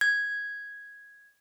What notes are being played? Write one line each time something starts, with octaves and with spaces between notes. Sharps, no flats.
G#6